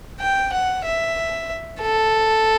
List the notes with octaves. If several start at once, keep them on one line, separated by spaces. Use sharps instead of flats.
G5
F#5
E5
A4